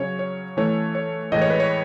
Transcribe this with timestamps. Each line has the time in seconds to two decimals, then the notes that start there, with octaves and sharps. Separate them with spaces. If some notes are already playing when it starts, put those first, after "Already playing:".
Already playing: C#3 F#3 C#4 C#5
0.19 C#5
0.57 E3 A3 C#4 C#5
0.95 C#5
1.32 A2 E3 G#3 D#5
1.41 C#5
1.50 B4
1.60 C#5